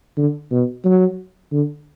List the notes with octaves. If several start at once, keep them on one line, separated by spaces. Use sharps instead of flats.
D3
B2
F#3
D3